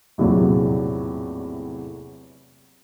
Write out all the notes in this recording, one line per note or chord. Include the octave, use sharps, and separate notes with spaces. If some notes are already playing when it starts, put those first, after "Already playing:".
A#1 E2 A2 C3 F#3